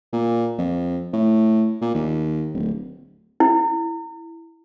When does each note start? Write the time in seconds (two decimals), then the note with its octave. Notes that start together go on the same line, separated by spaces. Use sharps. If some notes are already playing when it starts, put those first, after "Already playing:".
0.13 A#2
0.58 F2
1.13 A2
1.82 A#2
1.95 D#2
2.54 D1
3.40 E4